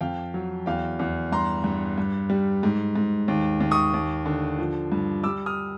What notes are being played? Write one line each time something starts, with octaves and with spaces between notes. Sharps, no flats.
F2 F5 G5
F#3
E2 F5 G5
E2
G2 A#5 C6
G2
G2
G3
G#2
G#2
D#2
D#2
C#6 D#6
D#2
D3
F3
G2
G3 D6 E6
D#6 F6